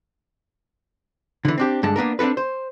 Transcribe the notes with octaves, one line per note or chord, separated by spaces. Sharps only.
D3 E3
C4 D4 G4
G2 D3 G#3 A5
A#3 B3 D4 A#4
C4 D4 F4 A4 B4
C5